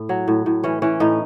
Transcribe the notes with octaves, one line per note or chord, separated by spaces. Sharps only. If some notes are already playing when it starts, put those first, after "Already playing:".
Already playing: A2
F#3
A2
A2
E3 C#4
E3 C#4
A2 D#4